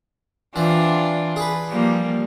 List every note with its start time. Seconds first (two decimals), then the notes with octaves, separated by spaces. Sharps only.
0.56 E3 C4 D4 F4
1.36 G#4 B4
1.69 F3 G3 A#3